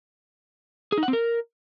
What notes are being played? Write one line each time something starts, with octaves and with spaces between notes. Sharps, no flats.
G#4
D#4
F#5
C4
A#4